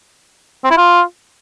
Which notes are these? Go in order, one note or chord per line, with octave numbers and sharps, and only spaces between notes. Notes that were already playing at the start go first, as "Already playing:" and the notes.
C4
E4
F4